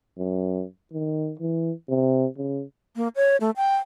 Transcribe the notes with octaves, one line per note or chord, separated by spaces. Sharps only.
F#2
D#3
E3
C3
C#3
A#3
C#5
A3
G5